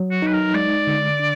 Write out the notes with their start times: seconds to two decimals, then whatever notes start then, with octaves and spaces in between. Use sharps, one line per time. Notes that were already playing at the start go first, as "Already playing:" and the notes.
Already playing: F#3
0.11 F#4
0.22 D#4 B4
0.33 A#4
0.54 G#3 D5
0.87 D3
1.19 D4